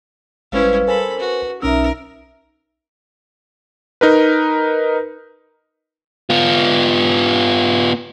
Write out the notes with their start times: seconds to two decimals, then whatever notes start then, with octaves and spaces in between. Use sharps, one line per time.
0.52 G#1 G3 G#3 C#4 E4 B4 C5 F5
0.88 A4 A#4 C5 G#5 B5
1.19 F#4 B4
1.62 B1 C#4 D#4 A#4 E5 E6
4.01 D#4 A#4 B4
6.30 B3 F4